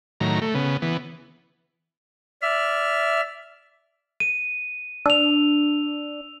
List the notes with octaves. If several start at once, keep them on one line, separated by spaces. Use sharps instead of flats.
A2 D#3 F#3 A#5
A3
C#3 B3
E3 B3
D5 E5 F6
D#7
D4 E6 F7